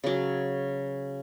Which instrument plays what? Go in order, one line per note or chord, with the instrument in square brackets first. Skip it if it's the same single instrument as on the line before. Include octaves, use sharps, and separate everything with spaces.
[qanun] C#3 F#3